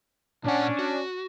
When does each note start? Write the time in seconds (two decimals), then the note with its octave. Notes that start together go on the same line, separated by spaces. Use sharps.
0.44 A#2 C#4 D4 F#5
0.79 F#4